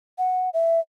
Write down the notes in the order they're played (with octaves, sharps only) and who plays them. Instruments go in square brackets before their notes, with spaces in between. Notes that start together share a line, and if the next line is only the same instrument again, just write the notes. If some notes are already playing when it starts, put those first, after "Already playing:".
[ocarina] F#5
E5